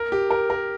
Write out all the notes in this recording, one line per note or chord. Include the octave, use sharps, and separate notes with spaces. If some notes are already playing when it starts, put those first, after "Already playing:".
Already playing: A#4
G4
A#4
A#4